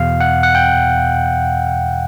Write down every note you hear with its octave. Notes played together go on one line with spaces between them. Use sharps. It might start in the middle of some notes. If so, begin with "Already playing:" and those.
Already playing: E2 B2 F5
F#5
F#5
G5